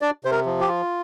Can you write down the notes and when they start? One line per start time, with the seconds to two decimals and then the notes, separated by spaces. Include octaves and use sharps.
0.01 D4 D5
0.24 C3 C5
0.31 A#4
0.46 F3
0.60 G4
0.68 F4